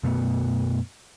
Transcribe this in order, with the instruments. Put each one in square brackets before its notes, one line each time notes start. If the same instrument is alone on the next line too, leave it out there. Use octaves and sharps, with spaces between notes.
[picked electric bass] F#2 B2 A3 B3